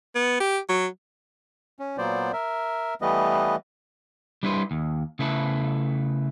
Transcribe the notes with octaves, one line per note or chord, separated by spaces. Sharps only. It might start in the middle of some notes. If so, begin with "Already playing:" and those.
B3
G4
F#3
C#4
A#2 F#3 B3 C5 D5
A#4 E5
E3 G3 A3 B3 B4 D#5
G3 D4 E4 B4 C5
D#2
C#3 A3 E4 A4 B4